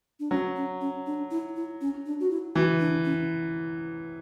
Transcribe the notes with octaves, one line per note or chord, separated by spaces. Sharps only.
D4
F#3 C#4
C#4
C#4
D4
E4
E4
C#4
D4
F#4
E4
E3 F#4
D4
C#4